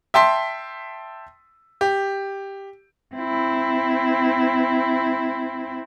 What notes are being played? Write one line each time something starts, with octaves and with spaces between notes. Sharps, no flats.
E5 G5 A5 C6 B6
G4
C4 E4